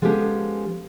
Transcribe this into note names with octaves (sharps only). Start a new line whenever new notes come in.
F3 G#3 B3 C#4 G4 A4